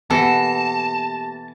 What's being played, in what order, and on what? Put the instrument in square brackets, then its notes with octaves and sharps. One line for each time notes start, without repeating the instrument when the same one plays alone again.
[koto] E3 A4 [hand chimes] A#3 G4 A#6 [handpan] B3 [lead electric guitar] A5